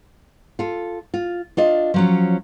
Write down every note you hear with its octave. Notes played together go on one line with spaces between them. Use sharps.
F4 A4
F4
D4 F4 D#5
F3 F#3 C#4